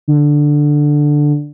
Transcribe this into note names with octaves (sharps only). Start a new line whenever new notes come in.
D3